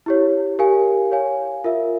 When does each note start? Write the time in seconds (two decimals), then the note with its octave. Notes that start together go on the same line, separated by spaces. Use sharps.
0.06 E4 G4 C#5
0.59 G4 A#4 F5 G#5
1.12 C#5 F5 G#5
1.64 F4 A#4 E5